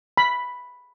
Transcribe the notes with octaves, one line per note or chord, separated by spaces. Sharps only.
B5